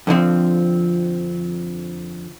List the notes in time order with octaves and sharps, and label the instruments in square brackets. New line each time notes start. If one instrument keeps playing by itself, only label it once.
[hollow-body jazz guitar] F2 D3 F3 C4